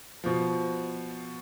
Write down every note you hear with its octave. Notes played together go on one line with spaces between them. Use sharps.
B2 F3